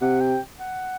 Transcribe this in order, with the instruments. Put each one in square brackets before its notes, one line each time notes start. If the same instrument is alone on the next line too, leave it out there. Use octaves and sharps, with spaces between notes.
[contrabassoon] C3 [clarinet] F#5
[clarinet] G5
F#5